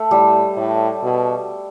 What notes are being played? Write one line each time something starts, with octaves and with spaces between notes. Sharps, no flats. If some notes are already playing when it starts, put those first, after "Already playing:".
Already playing: A3
A2 G3
A2
B2